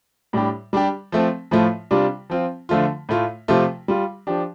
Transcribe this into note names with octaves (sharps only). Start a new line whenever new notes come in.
A2 G3 D4 G4
G3 D4 G4
F3 A3 C4
A2 F3 A3 F4
C3 G3 D4 F4
F3 C4 F4
D3 F3 A3 F4
A2 A3 F4
C3 F3 A3 F4
G3 F4
F3 D4 G4